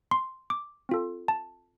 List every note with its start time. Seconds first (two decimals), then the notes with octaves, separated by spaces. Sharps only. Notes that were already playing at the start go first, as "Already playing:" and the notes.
0.11 C6
0.50 D6
0.89 C4 F4 A4
1.28 A5